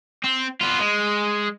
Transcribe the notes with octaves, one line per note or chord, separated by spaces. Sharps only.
C4
B3 F4
G#3